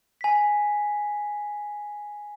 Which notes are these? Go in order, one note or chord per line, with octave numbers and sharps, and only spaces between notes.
G#5 B6